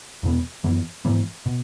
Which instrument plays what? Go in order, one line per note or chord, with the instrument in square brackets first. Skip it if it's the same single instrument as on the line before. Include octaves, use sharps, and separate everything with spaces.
[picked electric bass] E2 B2 B3
F#2 E3 B3
G#2 E3 B3
B2